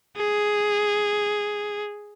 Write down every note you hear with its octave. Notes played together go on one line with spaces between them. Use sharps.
G#4